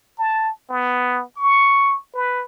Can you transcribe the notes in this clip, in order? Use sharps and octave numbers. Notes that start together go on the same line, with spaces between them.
A5
B3
C#6
B4